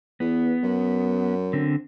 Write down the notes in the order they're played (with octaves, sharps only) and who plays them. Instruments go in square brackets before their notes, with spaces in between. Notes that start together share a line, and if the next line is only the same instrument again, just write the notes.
[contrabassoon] E2 [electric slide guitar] B3
[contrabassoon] F#2
[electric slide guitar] D3 C4